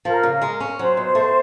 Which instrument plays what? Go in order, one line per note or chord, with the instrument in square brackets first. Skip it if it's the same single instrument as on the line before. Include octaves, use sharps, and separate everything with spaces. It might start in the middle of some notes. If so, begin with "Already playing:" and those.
[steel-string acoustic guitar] F3 [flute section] A#4
[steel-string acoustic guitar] C#3
G#3
C#4
[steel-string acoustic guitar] F#3 [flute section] C5
[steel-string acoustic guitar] B2
A3